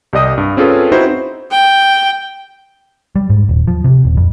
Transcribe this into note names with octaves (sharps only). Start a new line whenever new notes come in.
C2 G4 D5 D#5 D#6
G2
C4 C#4 F4 G#4 A4 B4
C4 D#4 E4 F#4 C5
G5
G3
G#2
D#1
F3
C3
D#1
F2